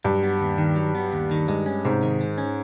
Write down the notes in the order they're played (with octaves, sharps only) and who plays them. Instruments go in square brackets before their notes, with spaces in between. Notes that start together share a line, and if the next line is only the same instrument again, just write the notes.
[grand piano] G2 [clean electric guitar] F#3
[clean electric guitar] B3
D#2
D#3
F#3
B3
D#2
D#3
[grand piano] G2 [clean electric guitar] G#3
[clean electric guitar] C#4
[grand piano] G#2 [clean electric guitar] C3
[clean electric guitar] D#3
G#3
C#4